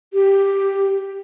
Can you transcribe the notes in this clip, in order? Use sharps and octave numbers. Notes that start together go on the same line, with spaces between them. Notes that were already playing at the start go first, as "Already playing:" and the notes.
G4